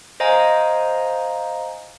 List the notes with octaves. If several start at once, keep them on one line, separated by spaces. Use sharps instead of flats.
C5 D#5 F5 G#5 A#5